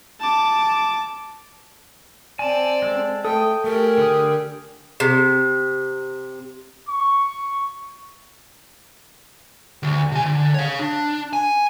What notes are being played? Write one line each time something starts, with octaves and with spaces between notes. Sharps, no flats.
A5 D6
C4 D5 G#5 A5
G#3 A4
A3 A4 G5 D#6
A3 G4 G#4 A#4
D3 D#6
C3
C#6
D2
C3 G#5
D3
C#5 F5
D4
G#5